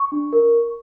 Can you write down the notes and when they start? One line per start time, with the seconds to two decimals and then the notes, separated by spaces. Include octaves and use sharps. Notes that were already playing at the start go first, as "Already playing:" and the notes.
Already playing: C#6
0.12 D4
0.33 A#4